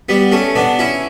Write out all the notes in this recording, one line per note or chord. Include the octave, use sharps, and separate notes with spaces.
G3 B3
A3 C#4
B3 D4
C#4 E4